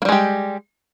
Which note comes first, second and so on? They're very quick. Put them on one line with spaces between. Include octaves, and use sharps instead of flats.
A#3 G3 G#3 G4